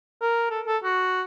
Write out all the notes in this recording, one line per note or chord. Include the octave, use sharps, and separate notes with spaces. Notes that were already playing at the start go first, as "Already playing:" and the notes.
A#4
A4
A4
F#4